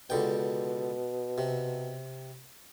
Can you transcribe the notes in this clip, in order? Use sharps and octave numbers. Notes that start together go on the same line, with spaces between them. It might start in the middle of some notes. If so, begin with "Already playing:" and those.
C#2 B2 D3 G5
C3